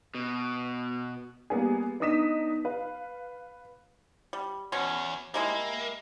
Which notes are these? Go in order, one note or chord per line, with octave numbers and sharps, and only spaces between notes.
B2
G3 A#3 B3 G#4
B3 D4 D#4 D#6 B6 E7
B4 F5
G3
E2 B2 C#4
G3 G#3 A#3 E4